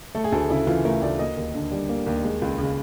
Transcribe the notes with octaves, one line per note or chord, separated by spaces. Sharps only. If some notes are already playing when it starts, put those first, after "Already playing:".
A3 A4
G#4
D2 A4
C#3 E4
E3 F4
A3 A#4
D2 D5
A#3 D#5
D#2
D3
G3
A#3
D#2
G#3
C#2
C#3